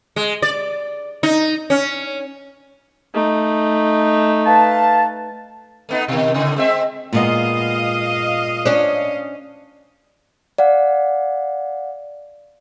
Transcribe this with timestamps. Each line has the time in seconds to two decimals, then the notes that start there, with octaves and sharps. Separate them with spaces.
0.16 G#3
0.42 D5
1.23 D#4
1.70 C#4
3.14 A3 D#4
4.46 B4 F5 A5
5.89 A3 B3 D#4
6.08 B2 D#3
6.34 A2 C#3 A3
6.56 G#3 C4 E5
7.13 A#2 G#3 B3 D#5 F5
8.65 C#4 D4
10.58 D5 F5 F#5